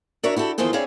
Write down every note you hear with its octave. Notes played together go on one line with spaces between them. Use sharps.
D4 F#4 A#4 C#5 E5
E4 F#4 G4 A4
E2 D#3 F3 G#4 A4 C5
C4 D4 E4 G#4 C#5 F5